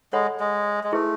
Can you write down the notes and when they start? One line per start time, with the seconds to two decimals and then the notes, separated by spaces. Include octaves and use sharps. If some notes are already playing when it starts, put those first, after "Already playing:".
0.13 G#3 A4 C#5 F#5 B5
0.40 G#3
0.84 G#3
0.92 A3 E4 G#4 B4